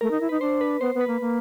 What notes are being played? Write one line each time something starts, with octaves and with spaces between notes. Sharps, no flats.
A3 A#4
D#4
E4
D#4 B4
D4 C5
B4
B3 C5
B3
B4
A#3
A#3